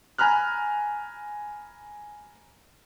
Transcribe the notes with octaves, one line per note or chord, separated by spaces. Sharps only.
G#5 A#5 B5 F6 F#6